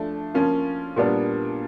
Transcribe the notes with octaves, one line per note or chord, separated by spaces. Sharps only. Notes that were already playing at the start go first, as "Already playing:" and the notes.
Already playing: F3 A3 D4
F3 A#3 C#4 F4
A#2 G3 B3 D4